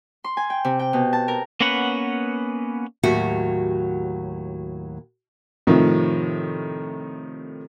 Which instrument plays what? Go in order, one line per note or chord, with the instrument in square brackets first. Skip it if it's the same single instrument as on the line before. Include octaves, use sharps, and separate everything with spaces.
[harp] C6
G#5
G5
C3
G5
B2
A5
A#4
[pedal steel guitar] A#3 B3 C#4 B4 F#5
[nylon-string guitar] D#2 A2 F#3 F#4 G4 F#5
[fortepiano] A2 C3 D#3 F3